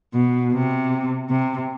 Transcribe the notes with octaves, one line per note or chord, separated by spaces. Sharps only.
B2
C3
C3